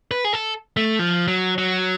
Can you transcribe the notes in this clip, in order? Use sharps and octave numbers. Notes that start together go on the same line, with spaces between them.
B4
G#4
A4
A3
F3
F#3
F#3